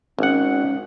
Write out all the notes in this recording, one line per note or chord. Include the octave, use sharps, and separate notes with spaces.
G#1 C#4 F#5